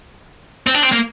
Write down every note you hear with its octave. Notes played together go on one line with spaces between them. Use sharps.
C4
D4
C4
A#3